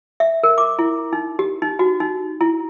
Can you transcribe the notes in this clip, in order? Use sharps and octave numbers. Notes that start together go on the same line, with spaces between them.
E5
A#4
D6
E4
D#4
G4
D#4
F#4
D#4
E4